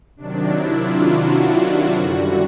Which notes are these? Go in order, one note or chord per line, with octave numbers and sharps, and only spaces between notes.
C3 D#3 F#3 D4
E4
F4
F#4
F#2 D3 G3